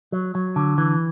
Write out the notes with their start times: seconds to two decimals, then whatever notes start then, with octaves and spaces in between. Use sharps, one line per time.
0.12 F#3
0.35 F#3
0.56 D3
0.78 E3